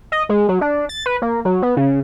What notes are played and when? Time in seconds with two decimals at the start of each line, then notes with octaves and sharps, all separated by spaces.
0.12 D#5
0.29 G#3
0.49 F#3
0.61 D4
0.89 A6
1.06 B4
1.22 A#3
1.45 F#3
1.62 B3
1.77 C#3